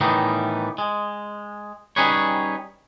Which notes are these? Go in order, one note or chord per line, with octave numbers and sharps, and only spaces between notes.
A2 D#3 E3 G3 B3 D#4
G#3
G3 C#4 D#4 G#4 B4 C#5